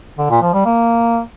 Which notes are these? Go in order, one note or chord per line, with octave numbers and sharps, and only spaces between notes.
D3
A#2
F3
G3
A#3